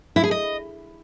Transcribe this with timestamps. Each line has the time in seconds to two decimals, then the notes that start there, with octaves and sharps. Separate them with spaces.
0.16 E4
0.24 G#4
0.31 D#5